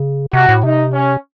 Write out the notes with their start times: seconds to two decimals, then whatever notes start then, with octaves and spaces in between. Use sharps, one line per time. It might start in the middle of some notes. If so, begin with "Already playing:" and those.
Already playing: C#3
0.33 C3 F#4
0.49 A2
0.63 C3 D#4
0.93 C#4